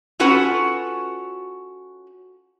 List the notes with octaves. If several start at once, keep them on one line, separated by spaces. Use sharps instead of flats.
C#4 F4 F#4 A4 B4 F#5